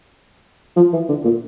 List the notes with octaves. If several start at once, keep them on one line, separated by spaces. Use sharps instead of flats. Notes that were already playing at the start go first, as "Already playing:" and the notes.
F3
E3
D3
A#2